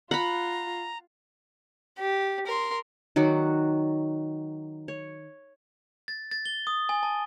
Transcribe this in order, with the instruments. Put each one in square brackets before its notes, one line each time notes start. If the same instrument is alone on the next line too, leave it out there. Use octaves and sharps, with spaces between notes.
[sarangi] F4 [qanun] F#5 B5 [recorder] A#5
[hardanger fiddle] G4
A#4 C6
[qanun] D#3 F#3 F#4 D5
C#5
[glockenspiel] A6
A6
G7
D#6
G#5
A5